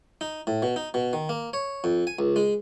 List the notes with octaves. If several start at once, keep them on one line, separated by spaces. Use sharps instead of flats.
D#4
A2
B2
D#4
B2
D#3
A#3
C#5
F2
G#5
C#2
G#3